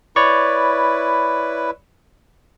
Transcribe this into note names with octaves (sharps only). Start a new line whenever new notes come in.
E4 B4 C#5 D5 C#6